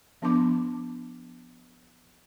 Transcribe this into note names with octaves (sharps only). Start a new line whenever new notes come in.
F3 B3 D4 A5 C6 D6